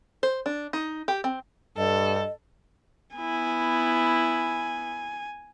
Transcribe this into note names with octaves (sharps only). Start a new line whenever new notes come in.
C5
D4
D#4
G4
C4
G2 A4 D#5
B3 E4 G#5